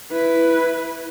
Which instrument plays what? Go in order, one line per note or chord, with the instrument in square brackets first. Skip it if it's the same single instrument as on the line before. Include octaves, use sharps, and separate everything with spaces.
[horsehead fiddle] E4 B4